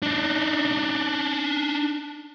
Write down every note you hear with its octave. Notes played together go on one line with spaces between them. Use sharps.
D4 D#4